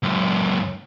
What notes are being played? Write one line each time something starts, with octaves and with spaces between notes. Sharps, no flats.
C#2 F#2